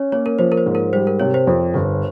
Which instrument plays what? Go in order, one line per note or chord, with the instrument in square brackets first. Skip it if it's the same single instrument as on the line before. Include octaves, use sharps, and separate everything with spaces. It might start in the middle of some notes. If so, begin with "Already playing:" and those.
Already playing: [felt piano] C#4 [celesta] C#5
[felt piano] A#3 [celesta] C#5
[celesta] A#4
[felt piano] F3 [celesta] C5
[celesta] A#4
C5
[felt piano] G#2
[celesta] A#4
[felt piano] G3 [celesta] C5
[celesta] A#4
[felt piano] C3 [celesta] C#5
[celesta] C5
[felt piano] F2
G1